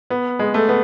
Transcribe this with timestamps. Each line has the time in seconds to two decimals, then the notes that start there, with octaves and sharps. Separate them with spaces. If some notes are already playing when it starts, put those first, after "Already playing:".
0.10 B3
0.39 G#3
0.54 A3
0.69 B3